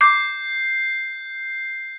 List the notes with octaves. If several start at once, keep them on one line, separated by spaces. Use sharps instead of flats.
D6 G6 C7